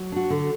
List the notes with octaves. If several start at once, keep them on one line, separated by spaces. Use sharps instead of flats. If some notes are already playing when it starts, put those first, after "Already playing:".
Already playing: F#3
D4 F#4
D3